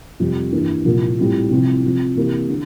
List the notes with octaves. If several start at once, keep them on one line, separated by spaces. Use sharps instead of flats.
F2 C3 G3
G2 E3 A#3
C2 A#2 F3 A#3
A2 G3 C4 F4
C2 C3 F3 C4 E4
C3 F3 C4 F4
C3 E3 A#3 E4 G4
D3